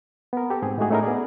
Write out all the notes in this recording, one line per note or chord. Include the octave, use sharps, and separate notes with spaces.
B3 A#4
G4 A4
G#2 C4 G#4
A2 G#3 A3 D#4 F#4 G#4
A3 C#4 D#4 E4 G#4 A#4
B3 G#4 D5